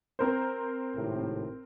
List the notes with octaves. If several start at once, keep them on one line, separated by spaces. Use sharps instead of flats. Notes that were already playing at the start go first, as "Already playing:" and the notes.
C4 A#4 C5
G#1 A2 C3